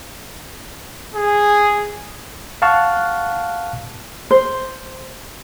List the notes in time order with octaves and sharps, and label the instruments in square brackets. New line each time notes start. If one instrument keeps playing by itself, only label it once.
[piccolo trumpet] G#4
[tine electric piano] F5 F#5 A5 C#6 F6 F#6
[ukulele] C5